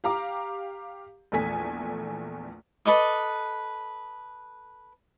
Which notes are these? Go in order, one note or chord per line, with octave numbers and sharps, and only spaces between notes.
G4 F5 A#5 D6
A#1 E2 A3 A4 G#5 B6
A4 B4 D#5 D6